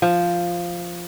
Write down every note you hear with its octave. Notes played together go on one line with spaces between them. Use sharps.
F3